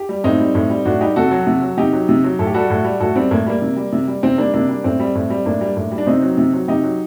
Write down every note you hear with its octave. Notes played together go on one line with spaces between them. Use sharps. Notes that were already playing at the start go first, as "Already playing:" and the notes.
Already playing: G4
G3
A2 C4 D#4
G3
A2
G3
A2 D4 F#4
G3 D#4 G4
C3 F#4 A4
F#3
C3
F#3
C3 D#4 G4
F#3
C3
F#3
A2 A4
G4
G3 F#4 A4
A2
G3
A2 F#4 A4
G3 C4
A2 A#3
G3 A#3
C3
G3
C3
G3
C3 C4
G3 A#3 D4
C3 A#3 D4
G3
A2 C4
G3
A2
G3
A2 A#3 D4
G3
A2
G3
D4
C3 C4 D#4
F#3
C3
F#3
C3 D#4 G4
F#3